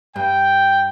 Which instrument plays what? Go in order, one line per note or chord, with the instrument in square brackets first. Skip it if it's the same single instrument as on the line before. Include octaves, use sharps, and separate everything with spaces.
[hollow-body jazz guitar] G2 [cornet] G5